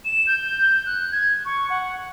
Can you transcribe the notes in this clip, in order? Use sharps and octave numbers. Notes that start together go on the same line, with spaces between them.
E7
G6
F#6
G#6
C#6
F#5